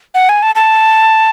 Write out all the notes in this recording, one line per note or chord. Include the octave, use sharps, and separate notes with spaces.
F#5
G#5
A5
A5